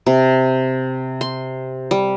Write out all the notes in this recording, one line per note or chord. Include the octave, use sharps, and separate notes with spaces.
C3
C6
G3